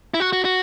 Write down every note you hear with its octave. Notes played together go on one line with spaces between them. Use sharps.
E4
F#4
F#4
F#4